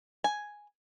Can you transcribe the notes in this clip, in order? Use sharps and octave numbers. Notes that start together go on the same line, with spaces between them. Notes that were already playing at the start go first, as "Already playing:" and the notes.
G#5